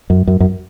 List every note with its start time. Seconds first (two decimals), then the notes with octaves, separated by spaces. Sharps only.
0.10 F#2
0.27 F#2
0.40 F#2